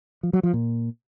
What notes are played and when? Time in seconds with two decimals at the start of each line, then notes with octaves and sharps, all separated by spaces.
0.23 F3
0.33 F#3
0.43 F3
0.53 A#2